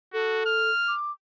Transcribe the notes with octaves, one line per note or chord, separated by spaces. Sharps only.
F#4 A4
F6
D6